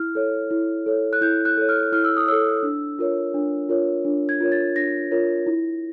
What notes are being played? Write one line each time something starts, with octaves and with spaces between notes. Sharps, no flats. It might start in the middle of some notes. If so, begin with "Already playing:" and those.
Already playing: E4 F6
A4 C#5
E4
A4 C#5
F#6
E4 G6
F#6
A4 C#5
F6
E4 F6
E6
D#6
A4 C#5 E6
D4
F4 A#4 C#5
D4
F4 A#4 C#5
D4
G#6
F4 A#4 C#5
A6
D4 A#6
F4 A#4 C#5
E4